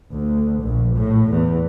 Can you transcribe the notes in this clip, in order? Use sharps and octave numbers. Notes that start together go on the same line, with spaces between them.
D2
A#1
A2
E2